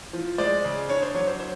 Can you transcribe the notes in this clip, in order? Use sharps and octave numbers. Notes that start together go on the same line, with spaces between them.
F3
G#3 C5 D5
C#3
D4 C#5
C5
F#3 C#5
C5
C5